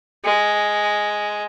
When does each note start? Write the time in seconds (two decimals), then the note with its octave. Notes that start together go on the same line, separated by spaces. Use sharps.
0.25 G#3